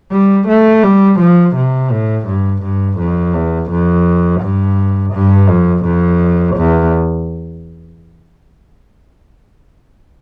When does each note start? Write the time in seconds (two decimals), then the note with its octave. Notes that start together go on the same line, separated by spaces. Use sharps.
0.12 G3
0.48 A3
0.83 G3
1.20 F3
1.56 C3
1.91 A2
2.26 G2
2.63 G2
2.99 F2
3.34 E2
3.70 F2
4.41 G2
5.13 G2
5.48 F2
5.85 F2
6.56 E2